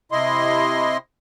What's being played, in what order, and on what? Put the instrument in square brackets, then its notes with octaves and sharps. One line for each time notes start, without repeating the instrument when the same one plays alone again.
[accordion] C3 E4 D#5 C6